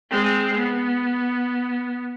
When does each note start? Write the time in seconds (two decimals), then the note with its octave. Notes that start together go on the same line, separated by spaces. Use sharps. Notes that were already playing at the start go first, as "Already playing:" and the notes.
0.10 G#3 C4
0.58 B3